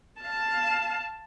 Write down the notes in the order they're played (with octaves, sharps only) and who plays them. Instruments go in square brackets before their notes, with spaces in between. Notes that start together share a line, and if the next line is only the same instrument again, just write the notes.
[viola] F5 A5